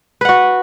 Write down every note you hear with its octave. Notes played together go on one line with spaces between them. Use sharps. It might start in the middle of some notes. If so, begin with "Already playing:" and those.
F#4 B4 F#5